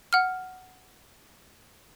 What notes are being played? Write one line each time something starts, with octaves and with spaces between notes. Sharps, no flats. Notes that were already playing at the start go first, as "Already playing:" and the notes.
F#5 F6